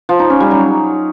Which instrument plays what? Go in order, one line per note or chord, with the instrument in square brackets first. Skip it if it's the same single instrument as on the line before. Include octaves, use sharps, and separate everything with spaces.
[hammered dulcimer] F3
D#4
C#4
G3
F#3